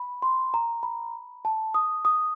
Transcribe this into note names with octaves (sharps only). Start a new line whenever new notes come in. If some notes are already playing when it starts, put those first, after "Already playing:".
Already playing: B5
C6
A#5
B5
A5
D#6
D#6